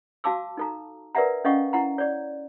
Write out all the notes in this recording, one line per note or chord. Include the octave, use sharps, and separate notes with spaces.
F#4 F5 A5 D6 E6
D#4 A4 A#5
A#4 B4 D5 E5 F#5 A#5
C#4 A4 D#5 F5 F#5 C#6
E4 F#5 A#5
C#5 D5